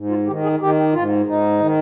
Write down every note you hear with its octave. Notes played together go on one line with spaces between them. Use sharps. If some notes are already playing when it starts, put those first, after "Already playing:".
Already playing: G#2
F4
D#3 G4
G#4
D#3 G4
G#2 F4
G#2 D#4
D#3